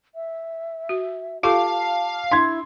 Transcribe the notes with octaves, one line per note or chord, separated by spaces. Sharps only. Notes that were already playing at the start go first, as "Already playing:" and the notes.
E5
F#4
F4 G4 A4 F5 A5 D6
D4 E4 C6 G#6